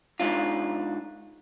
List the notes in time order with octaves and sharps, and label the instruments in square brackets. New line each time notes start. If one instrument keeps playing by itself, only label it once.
[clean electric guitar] G#2 D4 F4